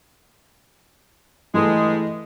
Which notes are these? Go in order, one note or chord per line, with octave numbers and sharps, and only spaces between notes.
G2 E3 G#3 A3 A4